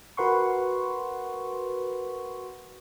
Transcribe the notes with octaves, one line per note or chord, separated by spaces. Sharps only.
F#4 A#4 B4 F#5 C6 C#6